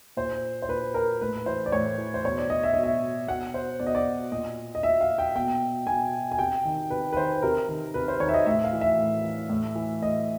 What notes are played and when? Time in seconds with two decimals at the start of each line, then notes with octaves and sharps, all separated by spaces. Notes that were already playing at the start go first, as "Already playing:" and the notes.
0.17 A#2 C5
0.62 C5
0.68 A#2 B4
0.94 A#4
1.21 A2 B4
1.46 E3 C5
1.66 D5
1.72 A2 C#5
1.98 E3
2.14 C5
2.25 B2 C#5
2.38 D5
2.50 D#5
2.63 E5
2.74 B2 D#5
2.83 E5
3.28 B2 F#5
3.54 C5
3.80 B2 D5
3.87 D#5
3.95 D5
4.32 A#2 D#5
4.75 D#5
4.83 A#2 E5
5.01 F5
5.18 G5
5.35 B2 G5
5.87 B2 G#5
6.32 G#5
6.39 C3 G5
6.65 D#3
6.90 C3 B4
7.13 B4
7.17 D#3 C5
7.42 C3 A#4
7.69 D#3
7.94 C3 B4
8.08 C5
8.20 D#3 C#5
8.29 E5
8.34 D#5
8.46 A2 E5
8.64 F5
8.73 E3
8.81 E5
8.98 A2
9.24 E3
9.50 A2
9.75 E3
10.02 A2 D#5